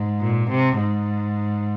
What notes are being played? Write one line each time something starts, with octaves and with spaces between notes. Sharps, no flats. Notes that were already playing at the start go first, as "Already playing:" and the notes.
Already playing: G#2
A#2
C3
G#2